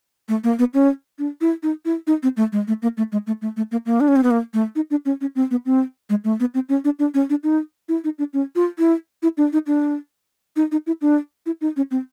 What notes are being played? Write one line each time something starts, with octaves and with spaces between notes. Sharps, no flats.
A3
A#3
B3
C#4
D4
E4
D#4
E4
D#4
C4
A3
G#3
A3
A#3
A3
G#3
A3
A3
A3
A#3
A#3
D4
C#4
C4
B3
A#3
A3
D#4
D4
C#4
C#4
C4
B3
C4
G#3
A3
B3
C4
C#4
D4
D4
C#4
D4
D#4
E4
D#4
D4
C#4
F4
E4
E4
D4
D#4
D4
D#4
D#4
E4
D4
E4
D#4
C#4
C4